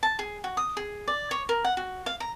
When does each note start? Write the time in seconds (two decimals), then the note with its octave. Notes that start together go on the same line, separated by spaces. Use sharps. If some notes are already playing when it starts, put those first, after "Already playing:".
0.03 A5
0.19 G#4
0.44 F#4
0.57 D#6
0.77 G#4
1.08 D5
1.31 C#5
1.49 A#4
1.64 F#5
1.77 F#4
2.06 F5
2.20 A#5